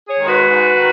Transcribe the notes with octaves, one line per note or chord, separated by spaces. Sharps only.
G#4 C#5
D#3 G#3
F#4 B4
G#2
D#3